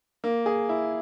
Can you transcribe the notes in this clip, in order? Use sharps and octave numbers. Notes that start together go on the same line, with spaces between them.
A#3
G#4
E4